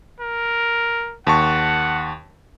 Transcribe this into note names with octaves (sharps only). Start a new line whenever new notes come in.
A#4
D#2 F#5 A5 C#6